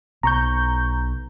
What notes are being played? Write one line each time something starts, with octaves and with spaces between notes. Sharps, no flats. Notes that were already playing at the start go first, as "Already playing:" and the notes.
B1 A#5 C#6 G6